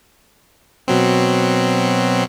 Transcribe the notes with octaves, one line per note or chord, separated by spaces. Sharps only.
B2 F#3 C4